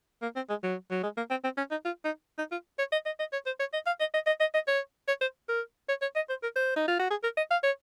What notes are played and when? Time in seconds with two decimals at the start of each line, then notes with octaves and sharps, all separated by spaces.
0.22 A#3
0.36 C4
0.49 G#3
0.63 F#3
0.91 F#3
1.03 G#3
1.17 A#3
1.30 C4
1.44 C4
1.57 C#4
1.71 D#4
1.85 F4
2.04 D#4
2.38 D#4
2.51 F4
2.79 C#5
2.92 D#5
3.06 D#5
3.19 D#5
3.32 C#5
3.46 C5
3.59 C#5
3.73 D#5
3.86 F5
4.00 D#5
4.14 D#5
4.27 D#5
4.40 D#5
4.54 D#5
4.67 C#5
5.08 C#5
5.21 C5
5.48 A#4
5.89 C#5
6.02 C#5
6.16 D#5
6.29 C5
6.43 A#4
6.56 C5
6.76 D#4
6.87 F4
6.99 F#4
7.10 G#4
7.23 A#4
7.37 D#5
7.50 F5
7.63 C#5